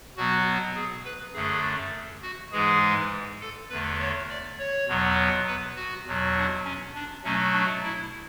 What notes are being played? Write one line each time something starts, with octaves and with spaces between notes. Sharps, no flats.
B2 F#3 B3 F#4
G#4
B4
F#2 D3 A3 G#4
F#4
G#2 E3 G#3 G#4
A4
E2 D3 A3 B4
C#5
D5
C#5
E2 B2 F#3 B3
B4
F#4
E2 B2 F#3
D4
C#4
D4
B2 F#3 A3 C#4
D4
E4